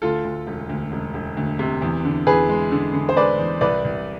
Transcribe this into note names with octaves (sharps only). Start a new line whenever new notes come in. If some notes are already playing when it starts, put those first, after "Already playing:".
D2 F4 A4
D2
E1
D2
E1
E1
D2
C3
E2
D3
E2 G#4 B4
G#3
D3
D3
C5
G#3 B4 D5
E2
C2 B4 D5
C2